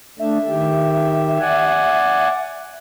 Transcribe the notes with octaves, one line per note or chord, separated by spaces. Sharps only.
A3 D4 E5
D#3 G4
D5 F#5 G#5